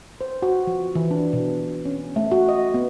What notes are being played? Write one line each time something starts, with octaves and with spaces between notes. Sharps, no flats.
C5
F#4
F3
E3
D4
B2
C#4
A3
F#4
D#5
B3